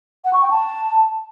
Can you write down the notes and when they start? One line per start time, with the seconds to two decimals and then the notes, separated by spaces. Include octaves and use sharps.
0.25 F#5
0.33 C#6
0.42 G5
0.50 A5